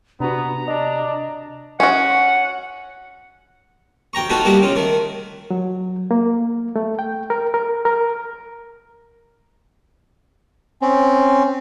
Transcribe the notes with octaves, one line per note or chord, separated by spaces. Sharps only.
C3 B3 D4 F#4 A#5
D4 D#5
C#4 F#4 F#5
D2 G5 A#5 C#6
A3 B3 D#4 F4 F#4 A4
G3 A#3 D#4 E4 F#4
C#3 F4
D#3 A3
F#3
A#3
A3
G5
A#4
A#4
A#4
C4 C#4